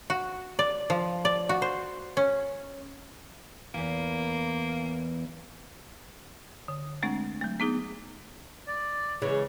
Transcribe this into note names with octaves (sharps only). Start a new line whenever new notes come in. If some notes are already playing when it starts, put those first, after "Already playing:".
F#4
D5
F3
D5
F#4
C5
C#4
E2 E3 A#3
D3
G#3 A3 C4 D4
F#3 A3
B3 D#4 G#4 D#6
D5
C#3 E3 G#3 C#5